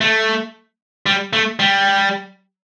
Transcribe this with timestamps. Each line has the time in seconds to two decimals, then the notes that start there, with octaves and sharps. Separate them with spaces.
0.01 A3
1.06 G3
1.33 A3
1.60 G3